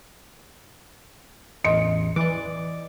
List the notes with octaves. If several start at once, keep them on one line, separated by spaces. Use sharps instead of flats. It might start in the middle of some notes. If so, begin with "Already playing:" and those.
A1 E2 D#5 C6 C#7
E3 D5 D6